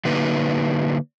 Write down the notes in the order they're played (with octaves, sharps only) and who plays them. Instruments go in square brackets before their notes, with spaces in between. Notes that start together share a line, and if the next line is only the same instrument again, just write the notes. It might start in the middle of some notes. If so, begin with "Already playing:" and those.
[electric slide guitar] D3 F#3 A#3 D#4 B4